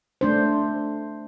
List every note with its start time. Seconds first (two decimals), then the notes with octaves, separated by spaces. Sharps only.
0.21 A3 D4 C5